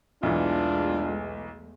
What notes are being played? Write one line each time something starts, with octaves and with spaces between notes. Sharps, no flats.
B1 E2 E3 G#3 A3 D4 F4